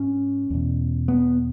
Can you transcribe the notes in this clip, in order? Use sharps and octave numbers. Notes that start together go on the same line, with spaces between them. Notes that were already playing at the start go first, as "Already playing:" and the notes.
Already playing: G#2 C#4
E2 B2
B3